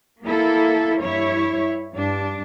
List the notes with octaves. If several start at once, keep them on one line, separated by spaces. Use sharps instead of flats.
A#3 E4 A4
G2 E4 C#5
G2 D4